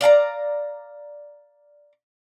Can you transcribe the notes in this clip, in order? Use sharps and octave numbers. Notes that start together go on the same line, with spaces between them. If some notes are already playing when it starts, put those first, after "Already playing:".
D5 F5 A5 A#5